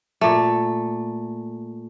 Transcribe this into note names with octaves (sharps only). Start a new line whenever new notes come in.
A#2 A3